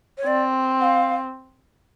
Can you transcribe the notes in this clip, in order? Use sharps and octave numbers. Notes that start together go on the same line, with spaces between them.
C#5
C4 D5
F#5
F5